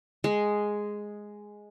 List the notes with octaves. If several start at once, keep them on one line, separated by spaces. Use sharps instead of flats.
G#3